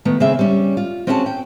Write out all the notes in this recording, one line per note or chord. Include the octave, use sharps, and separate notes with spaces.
D#3 A3 B3
C#3 C4 G#4 E5
G3 C#4
F4
C4 C#4 F#4 G#4 F5 A5
G5